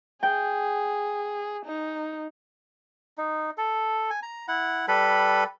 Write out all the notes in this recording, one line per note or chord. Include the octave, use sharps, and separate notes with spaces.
G#4 G5
D#4
D#4
A4
G#5
A#5
E4 F#5
G3 A4 B4 B5